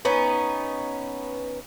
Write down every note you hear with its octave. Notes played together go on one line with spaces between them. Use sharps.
B3 C#4 D#4